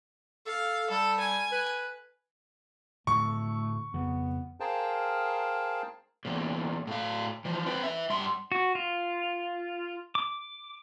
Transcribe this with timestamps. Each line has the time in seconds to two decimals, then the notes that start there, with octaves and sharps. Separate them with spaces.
0.46 A4 F5
0.91 G3 A4
1.20 G#5
1.52 B4
3.07 A2 D3 F3 A3 C#6
3.94 F2 C#3 B3
4.60 G#4 A#4 C5 F5 G5 A5
6.25 E2 A#2
6.87 A2 F5
7.45 E3 F3
7.66 C4 B4
7.83 B4 E5
8.10 G2 C6
8.52 F#4
8.75 F4
10.15 D6